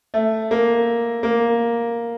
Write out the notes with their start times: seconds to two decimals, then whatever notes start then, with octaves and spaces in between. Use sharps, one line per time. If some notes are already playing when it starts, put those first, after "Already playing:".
0.14 A3
0.51 A#3
1.23 A#3